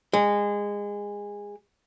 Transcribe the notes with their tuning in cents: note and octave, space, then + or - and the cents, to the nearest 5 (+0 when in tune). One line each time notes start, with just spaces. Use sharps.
G#3 -20